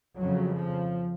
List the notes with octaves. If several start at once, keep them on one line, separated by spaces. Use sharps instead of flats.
F2 C#3 F#3
F3